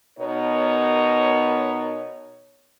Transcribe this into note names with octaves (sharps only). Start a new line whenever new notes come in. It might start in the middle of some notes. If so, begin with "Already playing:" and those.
B2 B3 D#4 A#4 C#5